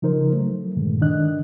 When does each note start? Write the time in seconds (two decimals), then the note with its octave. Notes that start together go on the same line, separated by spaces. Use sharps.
0.02 C#3 F3 D#4 A#4 C5
0.32 F#3 A3
0.76 G2 A#2 D3 D#3 G#3
1.01 D3 D#3 D4 D#5 F#6